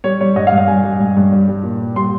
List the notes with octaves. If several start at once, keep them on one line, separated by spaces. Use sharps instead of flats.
G3 C#5
G3 C#5
G2 D#5
F5
G2
F5
G3 G#5
G3
G2
G2
G3
G3
A#2
A#2
G3 C6